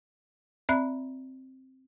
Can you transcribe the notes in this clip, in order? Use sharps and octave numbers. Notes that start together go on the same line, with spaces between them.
C4 D5 E5 B5 F#6